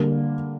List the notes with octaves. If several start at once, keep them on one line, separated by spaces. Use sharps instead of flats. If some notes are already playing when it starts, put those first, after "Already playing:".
Already playing: D3 G3 A#3